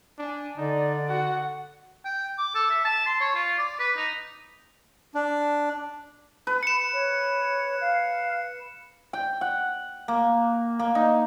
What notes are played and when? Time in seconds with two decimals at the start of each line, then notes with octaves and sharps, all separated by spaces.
0.18 D4 G#5
0.57 D3 D#4 D5
1.09 F#4 F#5
2.05 G5
2.38 D6
2.55 A4
2.70 E5
2.85 A5
3.06 C6
3.20 C#5
3.35 F4
3.58 D5
3.79 B4
3.97 D#4
5.15 D4
6.47 B4
6.63 C#7 E7
6.93 C#5
7.81 F5
9.13 G5
9.41 F#5
10.08 A#3
10.79 A#3
10.95 D#4